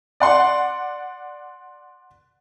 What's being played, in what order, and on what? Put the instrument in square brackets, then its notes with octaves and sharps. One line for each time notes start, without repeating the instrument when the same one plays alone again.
[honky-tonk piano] D5 F#5 C6